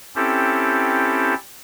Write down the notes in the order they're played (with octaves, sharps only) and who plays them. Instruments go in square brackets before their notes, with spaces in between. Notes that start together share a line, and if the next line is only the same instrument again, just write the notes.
[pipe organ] C4 C#4 E4 G4 A4